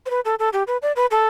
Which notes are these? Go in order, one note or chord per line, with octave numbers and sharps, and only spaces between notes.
C5
B4
A4
A4
G4
B4
D5
B4
A4